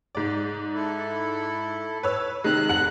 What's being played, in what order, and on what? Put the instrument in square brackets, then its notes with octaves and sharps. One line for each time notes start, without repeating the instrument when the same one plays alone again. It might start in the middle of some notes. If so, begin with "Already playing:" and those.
[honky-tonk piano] G#2 D5
[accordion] E4 A4
[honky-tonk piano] B4 C#5 E6
[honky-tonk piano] C3 D#3 G#3 [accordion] F#6
[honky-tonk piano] F1 F#5 F#7